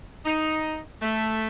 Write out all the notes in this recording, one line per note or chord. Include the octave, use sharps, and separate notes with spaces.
D#4
A3